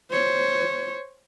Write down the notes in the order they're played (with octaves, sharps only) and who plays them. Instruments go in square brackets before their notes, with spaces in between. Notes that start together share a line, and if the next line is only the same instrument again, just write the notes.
[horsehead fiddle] C5 C#5